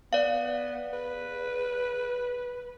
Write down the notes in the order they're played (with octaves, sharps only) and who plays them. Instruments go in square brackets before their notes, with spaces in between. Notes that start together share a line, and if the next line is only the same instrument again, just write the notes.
[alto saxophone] B3 [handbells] D5 F5
[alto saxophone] B4